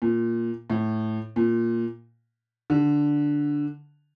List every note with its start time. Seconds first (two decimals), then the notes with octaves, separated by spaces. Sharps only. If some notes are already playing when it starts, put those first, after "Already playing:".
0.02 A#2
0.70 A2
1.36 A#2
2.70 D3